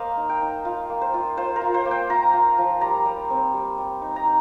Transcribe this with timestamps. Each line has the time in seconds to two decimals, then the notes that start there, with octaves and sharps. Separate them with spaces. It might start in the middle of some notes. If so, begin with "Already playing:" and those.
Already playing: A#3 C5 D#5 F5
0.17 D#4
0.29 G5
0.42 D#4
0.65 F4
0.89 A#3
1.01 C5
1.14 F4
1.37 F4 C5
1.56 A#4
1.61 F4
1.74 C5
1.85 A#3
1.91 G5
2.09 F4 A#5
2.33 F4
2.58 F3
2.81 G3 A#5
3.06 G3
3.30 C4
3.54 G3
3.78 G3
4.02 D#4
4.16 A#5
4.25 D#4